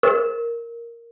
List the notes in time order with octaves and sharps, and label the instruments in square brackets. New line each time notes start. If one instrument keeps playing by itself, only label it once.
[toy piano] A#4